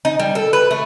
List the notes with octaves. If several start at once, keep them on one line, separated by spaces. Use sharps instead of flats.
D#4
G3
A4
B4
A3